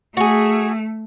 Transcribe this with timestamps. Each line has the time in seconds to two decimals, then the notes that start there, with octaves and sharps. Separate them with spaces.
0.17 A3 F#4 G#4